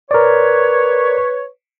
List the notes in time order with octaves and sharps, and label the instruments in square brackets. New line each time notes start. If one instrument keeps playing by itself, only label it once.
[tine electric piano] A#4 D5 [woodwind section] B4 C#5